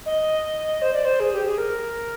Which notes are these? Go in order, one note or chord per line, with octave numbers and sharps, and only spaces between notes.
D#5
C5
D5
C5
G#4
G4
G#4
A#4